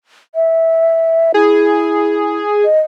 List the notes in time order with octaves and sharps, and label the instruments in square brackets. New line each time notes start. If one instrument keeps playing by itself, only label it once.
[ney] E5
[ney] E4 [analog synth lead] G#4
[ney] D#5